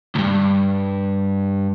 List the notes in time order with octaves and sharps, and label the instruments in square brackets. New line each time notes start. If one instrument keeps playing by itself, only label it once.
[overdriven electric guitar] C#2 G2